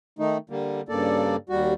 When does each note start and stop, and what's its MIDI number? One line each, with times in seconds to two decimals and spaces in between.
0.19 0.38 51
0.19 0.38 57
0.19 0.38 63
0.50 0.81 50
0.50 0.81 55
0.50 0.81 58
0.89 1.36 43
0.89 1.36 49
0.89 1.36 58
0.89 1.36 69
0.89 1.36 74
1.50 1.73 39
1.50 1.73 55
1.50 1.73 66